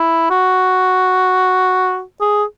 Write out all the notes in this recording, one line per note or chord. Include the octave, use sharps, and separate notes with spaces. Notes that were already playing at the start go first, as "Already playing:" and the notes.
Already playing: E4
F#4
G#4